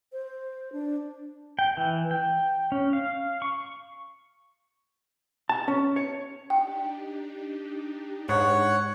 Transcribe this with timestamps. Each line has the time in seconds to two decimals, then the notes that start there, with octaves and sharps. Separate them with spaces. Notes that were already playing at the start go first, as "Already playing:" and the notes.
0.12 C5
0.72 D4
1.59 G5
1.77 E3
2.11 G5
2.72 C#4
2.93 F5
3.42 C#6
5.49 A5
5.68 C#4
5.96 C#5
6.50 D4 D#4 G4 G5
8.29 G#2 C#5 F#5